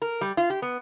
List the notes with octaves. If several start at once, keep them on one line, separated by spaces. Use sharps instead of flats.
A#4
G3
F4
G4
B3